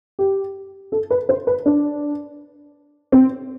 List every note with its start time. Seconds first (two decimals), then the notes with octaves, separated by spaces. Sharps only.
0.19 G4
0.92 A4
1.10 B4
1.29 C5
1.47 B4
1.66 D4
3.12 C4